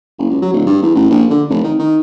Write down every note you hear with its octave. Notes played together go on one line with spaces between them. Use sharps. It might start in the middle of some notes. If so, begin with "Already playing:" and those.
F#1
C#2
F#3
D1
G2
E2
A1
A#1
D3
F1
D#3
D#3